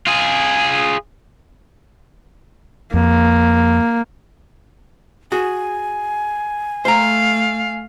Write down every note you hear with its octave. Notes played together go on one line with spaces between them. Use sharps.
F4 G#4
F2 A#3
F#4 G#4 G#5
A3 C5 F5 A#5